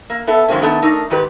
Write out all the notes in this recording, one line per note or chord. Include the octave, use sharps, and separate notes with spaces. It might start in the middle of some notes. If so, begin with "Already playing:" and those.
A#3
B3 A4 E5
D#3 F#3 G#3 A#3 C4 C#4
D#3 A3 B3 D4
A3 D4 D#4 A#4
G#2 D#3 G4 B4